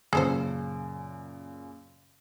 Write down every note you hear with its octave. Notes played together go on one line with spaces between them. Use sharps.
F#2 A#2 C#3 G#4 A4 C5